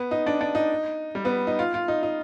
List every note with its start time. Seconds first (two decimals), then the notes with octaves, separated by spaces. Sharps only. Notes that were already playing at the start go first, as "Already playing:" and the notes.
Already playing: B3
0.11 D#4
0.26 D4
0.41 D4
0.55 D#4
1.15 G3
1.25 B3
1.47 D#4
1.59 F4
1.74 F4
1.88 D#4
2.03 D#4